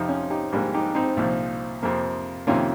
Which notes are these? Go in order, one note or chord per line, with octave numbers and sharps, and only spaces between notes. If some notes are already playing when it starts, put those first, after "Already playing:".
Already playing: F2 C3 F3 C4 D#4
C#4
D#4 G4
A#1 G#2 G3 A#3
D#4 G4
C4 D#4
C2 A#2 F3
F2 C3 F3 A#3
F2 C3 D#3 A#3 C#4 F4